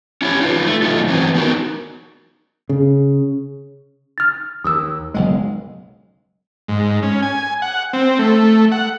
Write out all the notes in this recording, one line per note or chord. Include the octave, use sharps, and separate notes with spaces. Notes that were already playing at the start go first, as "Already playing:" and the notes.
C#4 E4 G4 C#5
D#4 F4 B4
A3
B2 F#3 G3 A3 D#4 F4
E3 F#3 C4 E4 B4
B3 D#4 F#4 A#4
C#3
F6 A6
D#2 D#6 E6
F#1 B1 G#3
G#2
C#4
G#5
F#5
C4
A3
F#5